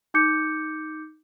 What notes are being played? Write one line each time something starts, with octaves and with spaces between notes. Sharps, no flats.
D#4 D6 G6 C#7